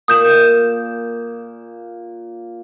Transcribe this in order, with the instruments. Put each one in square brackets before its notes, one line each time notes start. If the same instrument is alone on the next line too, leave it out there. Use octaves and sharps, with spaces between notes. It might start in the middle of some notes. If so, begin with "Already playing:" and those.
[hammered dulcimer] A#2 [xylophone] D#6 G6 E7